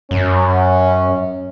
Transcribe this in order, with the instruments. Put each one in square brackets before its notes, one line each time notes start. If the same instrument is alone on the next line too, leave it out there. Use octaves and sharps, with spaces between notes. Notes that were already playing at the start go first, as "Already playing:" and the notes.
[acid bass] F#2 [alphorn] C#4